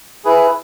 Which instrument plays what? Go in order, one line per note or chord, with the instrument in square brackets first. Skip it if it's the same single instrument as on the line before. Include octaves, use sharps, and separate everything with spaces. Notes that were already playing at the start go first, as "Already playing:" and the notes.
[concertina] E4 G#4 B4